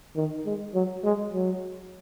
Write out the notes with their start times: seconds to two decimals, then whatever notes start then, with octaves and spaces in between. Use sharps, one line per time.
0.16 D#3
0.46 G#3
0.74 F#3
1.04 G#3
1.33 F#3